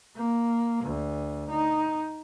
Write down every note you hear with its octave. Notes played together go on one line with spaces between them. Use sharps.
A#3
D2
D#4